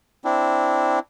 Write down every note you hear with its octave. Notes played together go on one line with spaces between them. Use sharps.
C4 D4 E4